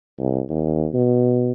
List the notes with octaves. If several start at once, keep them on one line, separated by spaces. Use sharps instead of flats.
C2
D#2
B2